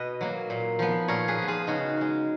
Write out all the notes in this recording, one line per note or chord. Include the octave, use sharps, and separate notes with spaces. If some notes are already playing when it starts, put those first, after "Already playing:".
Already playing: B2 B4 D#5
F#3 A#3
A#2
F3 B3
A#2 A#4 C#5
G#4 B4
F3 B3
F4 G#4
C#3 D#4 F#4
G#3 C#4